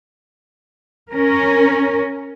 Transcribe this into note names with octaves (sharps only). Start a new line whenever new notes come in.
C#4 A#4